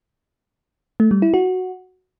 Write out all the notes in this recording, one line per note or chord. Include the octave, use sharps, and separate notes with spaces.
A3
G3
E4
F#4